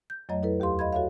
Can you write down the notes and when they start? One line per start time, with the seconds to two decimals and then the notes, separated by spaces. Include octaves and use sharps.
0.10 G6
0.29 F2 F#3 A3 C#5 D#5 A#5
0.43 E4 A4 B4
0.60 D#2 G4 F5 C6
0.79 D#5 F5 B5 G#6
0.93 F#4 A4 C#5 E5 F5